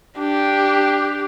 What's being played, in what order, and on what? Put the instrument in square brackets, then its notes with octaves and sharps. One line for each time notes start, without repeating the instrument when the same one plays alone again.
[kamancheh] D4 G4